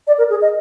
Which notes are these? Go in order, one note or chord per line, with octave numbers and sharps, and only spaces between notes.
D5
A#4
G#4
D#5